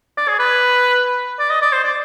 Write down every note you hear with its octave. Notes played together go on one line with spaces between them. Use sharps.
D5
G#4
B4
D5
D#5
D5
C5
D5